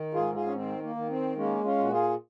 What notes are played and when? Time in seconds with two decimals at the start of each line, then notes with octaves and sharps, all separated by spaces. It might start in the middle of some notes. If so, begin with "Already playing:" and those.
Already playing: D#3
0.14 G#2 F4 G#4
0.34 F4 G#4
0.46 C#4
0.55 D#3 C4
0.83 A#3
0.96 D#3
1.09 C4
1.37 G#3 A#3 C#4
1.64 C#4 F4
1.78 A#2 F#4
1.92 F4 G#4